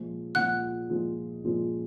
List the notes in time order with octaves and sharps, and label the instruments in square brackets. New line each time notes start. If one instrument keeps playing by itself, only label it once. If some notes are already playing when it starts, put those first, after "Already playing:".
Already playing: [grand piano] A#2 F3 G#3
[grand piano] A#2 F3 G#3 [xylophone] F#5 F#6
[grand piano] A#2 F3 G#3
A#2 F3 G#3